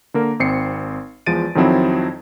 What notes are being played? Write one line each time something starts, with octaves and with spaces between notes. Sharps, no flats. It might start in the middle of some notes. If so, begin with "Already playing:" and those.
D3 A#3 A#4
G#1 C4 C7 C#7
E2 F3 G#3 A6 D7 D#7
F2 D#3 F3 F#3 C4 E4